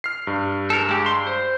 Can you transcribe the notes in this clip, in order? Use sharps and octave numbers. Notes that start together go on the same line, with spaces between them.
F6 C7
G2
A4 A#4
G#3 G4
C6
C5